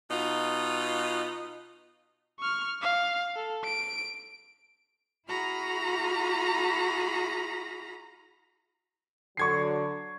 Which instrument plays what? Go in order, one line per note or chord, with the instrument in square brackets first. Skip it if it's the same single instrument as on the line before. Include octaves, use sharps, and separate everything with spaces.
[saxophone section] B2 D#4 F4
[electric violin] C#6 F6
F5
A4
D7
[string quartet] E4 F#4 G#4 A#5 B5 F6
[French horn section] D3 F#3 [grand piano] C#6 G#6 C7